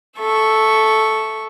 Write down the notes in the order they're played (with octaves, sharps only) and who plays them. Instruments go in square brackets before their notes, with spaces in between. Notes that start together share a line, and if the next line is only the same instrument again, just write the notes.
[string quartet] A4 E5 C#6